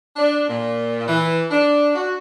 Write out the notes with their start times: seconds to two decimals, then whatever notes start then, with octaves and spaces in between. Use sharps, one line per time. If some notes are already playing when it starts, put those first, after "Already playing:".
0.16 D4
0.48 A#2
1.07 E3
1.50 D4
1.95 F#4